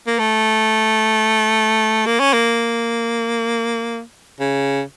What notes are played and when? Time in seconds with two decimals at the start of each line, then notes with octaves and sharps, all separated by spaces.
0.07 A#3
0.19 A3
2.06 A#3
2.20 C#4
2.33 A#3
4.40 C#3